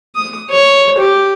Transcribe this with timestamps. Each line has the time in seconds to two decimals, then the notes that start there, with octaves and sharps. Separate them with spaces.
0.15 D#6
0.50 C#5
0.98 G4